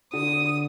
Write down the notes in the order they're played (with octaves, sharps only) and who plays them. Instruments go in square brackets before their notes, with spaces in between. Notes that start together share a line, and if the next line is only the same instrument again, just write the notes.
[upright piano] D3 [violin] D#6